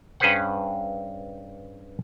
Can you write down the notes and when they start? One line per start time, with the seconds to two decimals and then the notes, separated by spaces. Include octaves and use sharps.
0.20 G2 C#4 G#4 B4 C5 F#5